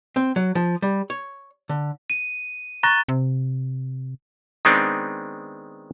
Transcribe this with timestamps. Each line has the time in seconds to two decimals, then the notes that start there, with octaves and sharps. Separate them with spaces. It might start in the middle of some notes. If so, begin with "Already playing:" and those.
0.16 C4
0.36 F#3
0.55 F3
0.82 G3
1.10 C#5
1.69 D3
2.10 D#7
2.83 A#5 C#6 F#6 A6 A#6
3.08 C3
4.65 D#3 G#3 B3 C4 D4 D#4